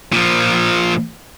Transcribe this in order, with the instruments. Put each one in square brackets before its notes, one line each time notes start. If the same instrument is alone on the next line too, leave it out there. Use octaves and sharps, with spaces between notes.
[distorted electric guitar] A#2 F3